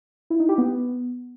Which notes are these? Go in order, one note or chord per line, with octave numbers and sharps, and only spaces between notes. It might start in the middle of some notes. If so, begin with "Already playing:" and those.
E4
D#4
G4
B3